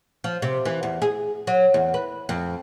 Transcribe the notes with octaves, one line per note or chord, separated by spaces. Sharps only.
F3
C3
E3
E2
G#4
F#3
E2
B4
F2